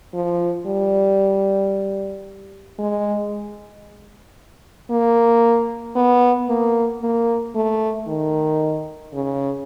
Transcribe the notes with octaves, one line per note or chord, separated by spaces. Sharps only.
F3
G3
G#3
A#3
B3
A#3
A#3
A3
D#3
C#3